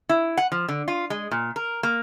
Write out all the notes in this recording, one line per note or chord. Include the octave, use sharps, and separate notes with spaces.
E4
F#5
F3
D3
F4
G#3
A#2
A#4
A#3